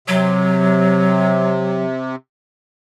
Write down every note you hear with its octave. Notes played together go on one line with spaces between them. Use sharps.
C3 F#3